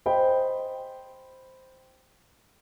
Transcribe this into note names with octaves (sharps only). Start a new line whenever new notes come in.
C5 D#5 G5 B5